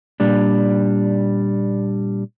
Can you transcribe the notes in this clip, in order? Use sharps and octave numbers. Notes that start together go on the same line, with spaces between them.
A#2 G3 D4